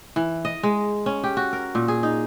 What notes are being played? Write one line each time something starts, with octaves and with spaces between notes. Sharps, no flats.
E3
D#5
G#3
C#4
G4
F#4
A#4
A#2
G#4
D#4